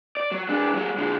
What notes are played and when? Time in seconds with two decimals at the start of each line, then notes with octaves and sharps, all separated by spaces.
0.17 D5
0.32 F#3
0.49 G#3 D4
0.75 F#3 G#3
0.98 D3 G#3